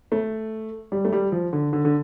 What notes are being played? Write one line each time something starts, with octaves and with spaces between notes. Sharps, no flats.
A3
G3
A3
G3
F3
D3
D3
D3